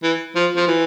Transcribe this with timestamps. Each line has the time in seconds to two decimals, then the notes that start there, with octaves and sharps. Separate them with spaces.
0.03 E3
0.35 F3
0.57 F3
0.67 E3